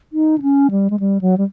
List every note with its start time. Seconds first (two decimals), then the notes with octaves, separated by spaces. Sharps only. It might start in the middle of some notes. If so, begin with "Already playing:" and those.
0.13 D#4
0.38 D4
0.42 C#4
0.71 G3
0.90 G#3
1.00 G3
1.21 F#3
1.38 G3